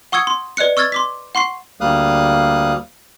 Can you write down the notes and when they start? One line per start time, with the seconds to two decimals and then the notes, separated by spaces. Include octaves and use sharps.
0.12 F#5 C#6 D#6 E6 G#6 C#7
0.27 C6
0.57 B4 D5 D#5 F#6 C#7
0.77 C#6 E6 F6 G#6 A6
0.92 C6 D6 B6
1.35 F#5 C6 C#6 C7
1.81 D2 G3 A#3 F5 D#6 F#6